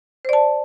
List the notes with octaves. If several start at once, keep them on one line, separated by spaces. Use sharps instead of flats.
C5 D5 A5